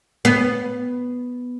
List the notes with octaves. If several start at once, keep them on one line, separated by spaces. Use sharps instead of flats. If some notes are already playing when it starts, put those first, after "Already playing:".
B3